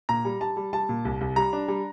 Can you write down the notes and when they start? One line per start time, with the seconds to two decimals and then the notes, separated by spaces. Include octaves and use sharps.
0.09 A#2 A#5
0.25 G3
0.40 G3 A5
0.57 G3
0.73 G3 A5
0.89 A#2
1.05 C2
1.21 C2
1.36 G3 A#5
1.53 D4
1.68 G3